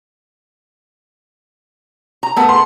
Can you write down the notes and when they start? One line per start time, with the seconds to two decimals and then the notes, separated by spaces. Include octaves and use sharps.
2.23 A#5
2.36 A3 B3 A#4
2.49 C6